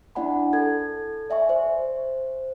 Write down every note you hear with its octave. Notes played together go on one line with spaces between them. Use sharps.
D4 E4 D5 F#5 G#5 B5
A4 G#6
D5 E5 G#5 C#6
C5